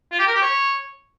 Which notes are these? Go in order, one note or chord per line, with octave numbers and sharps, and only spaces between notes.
F4
G4
A#4
G4
C#5